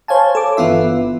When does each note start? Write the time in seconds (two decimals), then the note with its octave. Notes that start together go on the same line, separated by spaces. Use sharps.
0.08 C5 C#5 F5 G#5 A5
0.35 A4 D6
0.57 G1 E3 B3 F4 E5